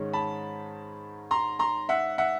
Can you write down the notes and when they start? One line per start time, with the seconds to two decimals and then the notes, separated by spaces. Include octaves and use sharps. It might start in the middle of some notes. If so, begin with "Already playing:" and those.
Already playing: G#2 D#3 G#3 C#4
0.13 A5 B5
1.31 A#5 C6
1.59 A#5 C6
1.89 E5 F#5
2.18 E5 F#5